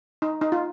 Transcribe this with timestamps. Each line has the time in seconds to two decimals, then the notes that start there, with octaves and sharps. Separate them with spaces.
0.22 D#4
0.41 D#4
0.52 F4